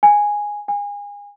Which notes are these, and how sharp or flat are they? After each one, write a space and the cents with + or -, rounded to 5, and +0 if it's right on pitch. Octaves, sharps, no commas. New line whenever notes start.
G#5 -5
G#5 -30